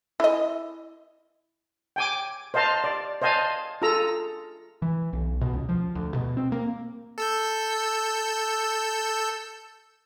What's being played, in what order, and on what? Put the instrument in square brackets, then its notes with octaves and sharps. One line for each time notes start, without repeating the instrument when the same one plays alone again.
[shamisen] E4 D#5
[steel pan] G5 G#5 D6
C5 D#5 F5 A5 A#5 C6
D5
C5 D#5 F5 G#5 A5
F4 G#4 A4 A#5 E6
[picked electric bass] E3
B1
B2
C#2
F3
D2
B2
C4
A#3
[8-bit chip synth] A4 E6 G6